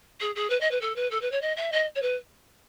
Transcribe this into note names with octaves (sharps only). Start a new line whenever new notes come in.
G#4
G#4
B4
D#5
B4
A4
B4
A4
B4
C#5
D#5
E5
D#5
C#5
B4